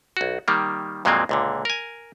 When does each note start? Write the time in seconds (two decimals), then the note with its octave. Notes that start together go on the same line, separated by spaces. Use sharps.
0.17 B1 F#4
0.48 D#3 G3 A#3
1.05 F2 A#2 F#3 G#3 A#3 C4
1.29 C#2 A#2 D3
1.65 A#4 G#5